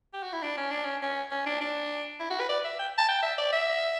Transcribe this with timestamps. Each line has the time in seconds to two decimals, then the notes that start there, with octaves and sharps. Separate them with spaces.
0.13 G4
0.23 F#4
0.33 E4
0.43 D4
0.57 C#4
0.71 D4
0.84 C#4
1.02 C#4
1.31 C#4
1.46 D4
1.61 D4
2.20 E4
2.30 F#4
2.40 B4
2.49 D5
2.64 E5
2.79 G5
2.98 A5
3.08 G5
3.23 E5
3.38 D5
3.53 E5